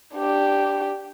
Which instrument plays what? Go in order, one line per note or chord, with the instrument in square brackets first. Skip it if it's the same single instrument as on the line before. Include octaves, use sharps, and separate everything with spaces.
[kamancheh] D4 G4